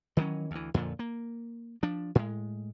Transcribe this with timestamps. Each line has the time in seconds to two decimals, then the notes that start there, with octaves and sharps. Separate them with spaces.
0.17 D#3 E3 F#3 C#4
0.51 D2 E3
0.74 F2 A#2 D3 F3
0.99 A#3
1.83 F3 D4
2.15 A2 G#3